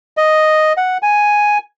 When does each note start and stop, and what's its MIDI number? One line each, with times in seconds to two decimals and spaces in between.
0.17 0.73 75
0.77 0.98 78
1.03 1.58 80